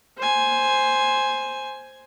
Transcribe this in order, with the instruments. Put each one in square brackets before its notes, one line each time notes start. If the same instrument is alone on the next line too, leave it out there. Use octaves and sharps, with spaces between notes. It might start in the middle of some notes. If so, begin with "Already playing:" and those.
[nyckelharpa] C5 G#5